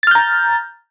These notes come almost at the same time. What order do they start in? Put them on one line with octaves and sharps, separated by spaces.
A6 F6 G6 A#5